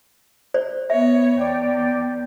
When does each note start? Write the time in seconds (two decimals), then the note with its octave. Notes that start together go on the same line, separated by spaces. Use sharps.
0.54 C5 D5
0.90 B3 C#5 E5
1.38 E2 D5 G5